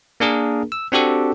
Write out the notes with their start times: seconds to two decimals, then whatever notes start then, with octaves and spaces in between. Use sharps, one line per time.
0.20 A#3 D4 G#4 A#4
0.72 E6
0.92 C4 D4 F#4 G4 A4